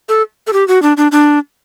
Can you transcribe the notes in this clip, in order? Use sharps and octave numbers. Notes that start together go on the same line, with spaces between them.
A4
A4
G4
F#4
D4
D4
D4